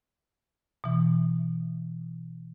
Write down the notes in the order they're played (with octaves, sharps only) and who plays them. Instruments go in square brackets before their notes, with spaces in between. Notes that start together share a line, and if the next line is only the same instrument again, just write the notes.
[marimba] B2 E3